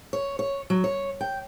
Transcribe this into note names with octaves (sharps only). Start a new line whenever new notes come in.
C#5
C#5
F#3
C#5
G5